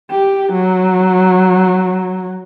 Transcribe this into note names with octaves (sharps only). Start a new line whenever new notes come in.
G4
F#3